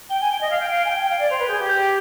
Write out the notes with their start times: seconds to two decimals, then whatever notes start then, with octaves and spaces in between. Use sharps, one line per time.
0.10 G5 G7
0.21 G#5
0.31 G5 G7
0.40 D#5
0.50 F5 G#6
0.59 G5
0.69 F5 D7
0.85 G#5
0.89 G5 G#6
1.01 G5
1.09 F5 D7
1.20 D5
1.29 C5 F7
1.39 B4
1.49 G#4 G6
1.59 G4
1.69 G6